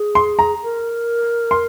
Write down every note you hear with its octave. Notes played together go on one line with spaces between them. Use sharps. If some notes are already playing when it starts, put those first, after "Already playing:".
Already playing: G#4
C6
A#5
A#4
C6